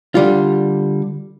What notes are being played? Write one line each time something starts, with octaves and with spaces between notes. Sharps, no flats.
D3 G3 F4